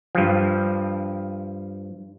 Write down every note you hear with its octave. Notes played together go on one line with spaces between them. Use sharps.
G2 F3